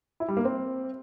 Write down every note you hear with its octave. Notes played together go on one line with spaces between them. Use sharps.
E4
G3
A#3
C4